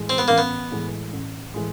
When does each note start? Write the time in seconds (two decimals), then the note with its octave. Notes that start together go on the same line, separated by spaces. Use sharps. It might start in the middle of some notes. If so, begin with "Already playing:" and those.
Already playing: A2 E3 G#3
0.09 C4
0.18 B3
0.28 A1 A#3
0.38 B3
0.71 A2 E3 G#3
1.13 A1
1.54 A2 E3 G#3